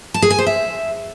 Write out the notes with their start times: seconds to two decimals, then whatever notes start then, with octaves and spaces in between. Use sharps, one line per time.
0.14 A5
0.22 G#4
0.30 G#5
0.38 C5
0.47 E5